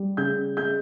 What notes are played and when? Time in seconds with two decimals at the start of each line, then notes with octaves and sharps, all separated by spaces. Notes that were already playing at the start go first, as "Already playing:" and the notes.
Already playing: G3
0.17 C#3 G6
0.57 G#3 G6